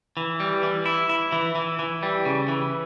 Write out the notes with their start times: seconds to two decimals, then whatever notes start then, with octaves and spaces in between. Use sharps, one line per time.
0.17 E3
0.40 G3
0.63 E3
0.86 E4
1.09 E4
1.32 E3
1.55 E3
1.79 E3
2.03 G3
2.25 C#3
2.48 E3